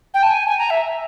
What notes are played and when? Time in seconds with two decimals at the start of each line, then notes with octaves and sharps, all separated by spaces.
0.14 G5
0.23 A5
0.30 G#5
0.47 G#5
0.59 A#5
0.70 E5